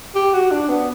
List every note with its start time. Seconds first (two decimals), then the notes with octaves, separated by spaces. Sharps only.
0.15 G4
0.34 F#4
0.51 D4
0.69 B3